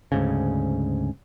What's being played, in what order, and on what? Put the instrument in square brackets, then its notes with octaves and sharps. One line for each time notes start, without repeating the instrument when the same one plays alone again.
[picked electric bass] D2 G#2 C#3